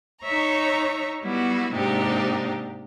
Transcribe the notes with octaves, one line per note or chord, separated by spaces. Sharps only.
D#4 C#5 E5 A#5 C#6
G3 B3 E4 F#4
G#2 C3 A#3 D4 D#4 G4